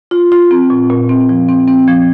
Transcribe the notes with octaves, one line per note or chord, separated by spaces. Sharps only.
F4
F4
C4
A#2
A#2
C4
F3
C4
C4
F3